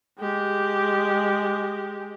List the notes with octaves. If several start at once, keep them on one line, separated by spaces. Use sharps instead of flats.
G#3 G4